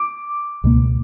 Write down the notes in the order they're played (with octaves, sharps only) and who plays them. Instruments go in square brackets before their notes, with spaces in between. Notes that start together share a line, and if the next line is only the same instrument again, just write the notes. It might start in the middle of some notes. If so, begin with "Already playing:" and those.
Already playing: [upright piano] D6
[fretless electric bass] C#2 B2 A#3